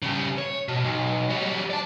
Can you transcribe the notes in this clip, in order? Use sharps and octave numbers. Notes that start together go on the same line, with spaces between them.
C#3 G3
C#5
B2
B1
F#3 G3
D5 A5